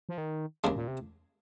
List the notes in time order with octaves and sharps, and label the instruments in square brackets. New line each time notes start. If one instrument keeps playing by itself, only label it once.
[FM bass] F3
D#3
[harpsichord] D#2 C#3 G#3
[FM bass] A#2
C3